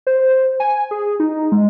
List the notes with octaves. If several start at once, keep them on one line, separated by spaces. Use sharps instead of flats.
C5
G#5
G#4
D#4
G#3